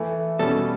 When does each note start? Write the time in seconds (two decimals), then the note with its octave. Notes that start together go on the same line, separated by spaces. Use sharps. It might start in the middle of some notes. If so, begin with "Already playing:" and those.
Already playing: E3 A3 E4
0.39 B2 G3 C#4 A4